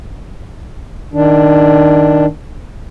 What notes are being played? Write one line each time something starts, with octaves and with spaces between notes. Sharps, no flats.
D#3 D4